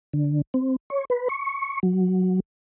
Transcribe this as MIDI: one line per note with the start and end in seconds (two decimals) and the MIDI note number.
0.13 0.42 50
0.54 0.76 60
0.90 1.05 73
1.10 1.28 71
1.29 1.80 85
1.83 2.40 54